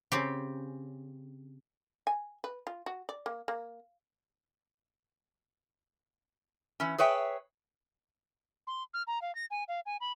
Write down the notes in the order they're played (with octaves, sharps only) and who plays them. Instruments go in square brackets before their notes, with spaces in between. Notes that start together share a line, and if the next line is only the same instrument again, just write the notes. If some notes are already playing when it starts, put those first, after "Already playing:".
[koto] C#3 C4 G4
[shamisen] G#5
B4
F4
F#4
D5
A#3
A#3
[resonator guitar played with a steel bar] E3 C#4
G#4 B4 C#5 E5 G5
[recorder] C6
F6
A#5
F5
A#6
G#5
F5
G#5
B5